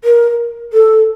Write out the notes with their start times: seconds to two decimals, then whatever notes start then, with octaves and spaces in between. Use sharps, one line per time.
0.04 A#4
0.73 A4